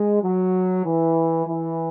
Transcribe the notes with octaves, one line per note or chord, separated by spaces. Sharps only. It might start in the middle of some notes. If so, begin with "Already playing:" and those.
Already playing: G#3
F#3
E3
E3